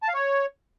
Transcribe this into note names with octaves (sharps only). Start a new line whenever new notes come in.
A5
F5
C#5